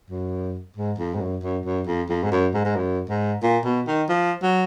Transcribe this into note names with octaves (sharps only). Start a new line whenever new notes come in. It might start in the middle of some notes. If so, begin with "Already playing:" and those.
F#2
G#2
F2
G#2
F#2
F#2
F#2
F2
F2
G#2
F#2
G#2
G#2
F#2
G#2
A#2
B2
D#3
F3
F#3